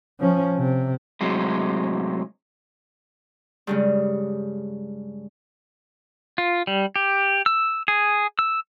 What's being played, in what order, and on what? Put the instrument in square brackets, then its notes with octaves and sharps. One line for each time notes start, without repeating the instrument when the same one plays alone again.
[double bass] F3 C#4
C3
[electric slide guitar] A2 C3 F#3 G#3
[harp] G2 C#3 G#3
[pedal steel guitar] F4
G3
G4
E6
G#4
E6